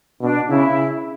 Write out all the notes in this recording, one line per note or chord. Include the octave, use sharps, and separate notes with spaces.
B2 D4
C#3 E4